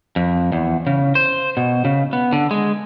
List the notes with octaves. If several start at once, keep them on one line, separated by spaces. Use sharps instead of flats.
F2
E2
C#3
C5
B2
C#3
B3
D3
G#3